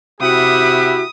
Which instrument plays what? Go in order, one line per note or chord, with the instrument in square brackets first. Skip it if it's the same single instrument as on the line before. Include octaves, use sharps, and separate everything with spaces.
[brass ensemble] C3 E4 G4 [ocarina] F#4 [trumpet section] E5 F#5 B5 [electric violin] D#6